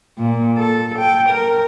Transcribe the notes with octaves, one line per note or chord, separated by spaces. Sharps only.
A#2
A4
G5
A#4